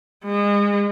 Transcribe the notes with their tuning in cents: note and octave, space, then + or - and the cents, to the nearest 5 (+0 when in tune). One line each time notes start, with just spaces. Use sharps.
G#3 -30